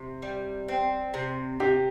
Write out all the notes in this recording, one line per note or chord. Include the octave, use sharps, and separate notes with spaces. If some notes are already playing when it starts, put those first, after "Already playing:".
Already playing: C3
G3
C4
C3
C3 G4